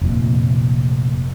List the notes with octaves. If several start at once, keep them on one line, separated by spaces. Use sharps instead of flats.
F1 A#2